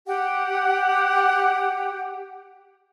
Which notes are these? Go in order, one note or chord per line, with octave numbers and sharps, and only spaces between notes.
G4 F#5 G5